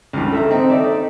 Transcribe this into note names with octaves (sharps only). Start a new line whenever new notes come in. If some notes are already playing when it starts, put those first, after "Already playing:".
C#2 G2
A4 E5 A#5
C4 D#4
D#4 A4 D5 E5